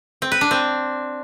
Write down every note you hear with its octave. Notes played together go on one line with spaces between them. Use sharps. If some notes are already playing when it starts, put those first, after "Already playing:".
C4
B4
D4
C4